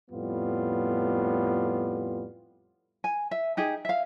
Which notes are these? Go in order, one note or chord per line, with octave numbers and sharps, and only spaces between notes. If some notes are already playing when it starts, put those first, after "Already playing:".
F2 A2 G3 B3 F4
G#5
E5
D#4 G4 G#4
E5 F5